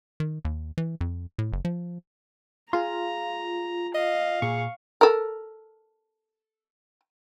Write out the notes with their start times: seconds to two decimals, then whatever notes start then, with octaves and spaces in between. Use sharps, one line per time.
0.20 D#3
0.45 D#2
0.78 E3
1.01 F2
1.39 A2
1.53 F#1
1.65 F3
2.73 F4 G#4 A#5 C6
3.95 D#5 F5
4.42 A#2 G#4 C#6
5.01 A4 A#4